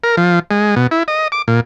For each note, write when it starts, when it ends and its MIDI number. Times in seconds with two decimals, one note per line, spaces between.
0.04 0.16 70
0.17 0.39 53
0.51 0.75 56
0.76 0.87 47
0.91 1.03 64
1.08 1.28 75
1.32 1.42 86
1.48 1.60 46